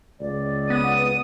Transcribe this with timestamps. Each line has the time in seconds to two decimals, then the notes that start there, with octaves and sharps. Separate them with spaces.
0.20 C#2 D5
0.70 B3 D#6